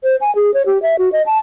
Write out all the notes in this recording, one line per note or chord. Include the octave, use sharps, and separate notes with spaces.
C5
G#5
G#4
C#5
G4
E5
F#4
D#5
A5